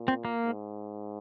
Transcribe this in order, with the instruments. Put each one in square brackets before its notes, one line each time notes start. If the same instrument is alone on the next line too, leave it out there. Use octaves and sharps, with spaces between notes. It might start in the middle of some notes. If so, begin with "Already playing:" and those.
Already playing: [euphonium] A#2
[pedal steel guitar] C4
A#3
[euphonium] G#2